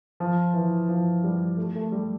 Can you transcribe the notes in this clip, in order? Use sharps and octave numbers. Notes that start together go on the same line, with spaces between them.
F3
E3
F3
G3
A3
A3
G3